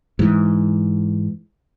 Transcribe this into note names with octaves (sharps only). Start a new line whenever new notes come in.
G#2 E3